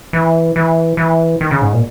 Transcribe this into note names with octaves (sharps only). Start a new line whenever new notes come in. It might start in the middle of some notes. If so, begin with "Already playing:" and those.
E3
E3
E3
D#3
C#3
G#2
A#2